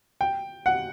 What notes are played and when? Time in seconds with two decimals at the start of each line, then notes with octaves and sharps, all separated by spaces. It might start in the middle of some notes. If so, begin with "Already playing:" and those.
0.21 G5
0.66 F#5